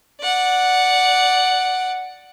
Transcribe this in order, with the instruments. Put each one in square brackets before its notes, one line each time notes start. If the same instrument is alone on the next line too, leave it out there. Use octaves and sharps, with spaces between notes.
[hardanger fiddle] D5 F#5